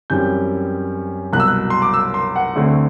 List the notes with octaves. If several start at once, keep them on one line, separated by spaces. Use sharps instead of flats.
F#2 E3 G3 C4 G6
C2 B2 F#3 F#6
E6
F#6
C6
D6
E6
C6
F#5
D2 D3 A3 C4